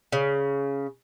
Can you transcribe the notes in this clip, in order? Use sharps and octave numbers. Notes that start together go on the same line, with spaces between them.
C#3